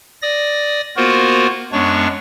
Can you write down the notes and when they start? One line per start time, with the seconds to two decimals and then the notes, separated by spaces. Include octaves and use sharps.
0.22 D5 D#6 A#6
0.96 A#3 B3 F4 F#4 A#4 C5
1.72 F#2 G#3 B3 D4 C#5 C#6